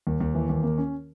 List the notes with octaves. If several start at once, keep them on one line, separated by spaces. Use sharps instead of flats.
D#2
D#2
E3
D#2
A#3
C#4